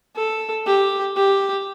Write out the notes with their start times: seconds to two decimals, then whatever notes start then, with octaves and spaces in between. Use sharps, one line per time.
0.16 A4
0.66 G4
1.16 G4